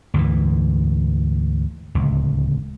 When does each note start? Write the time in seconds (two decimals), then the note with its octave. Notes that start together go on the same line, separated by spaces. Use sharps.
0.14 D2 G#2 E3
1.95 D1 C#2